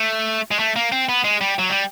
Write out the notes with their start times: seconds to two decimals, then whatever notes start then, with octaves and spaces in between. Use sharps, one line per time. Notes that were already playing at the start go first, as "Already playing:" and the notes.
Already playing: A3
0.51 G#3
0.59 A3
0.76 A#3
0.92 C4
1.09 B3
1.24 G#3
1.41 G3
1.59 F#3
1.70 G3